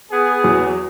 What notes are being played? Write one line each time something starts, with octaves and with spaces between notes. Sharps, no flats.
B3 G#4
E2 F#3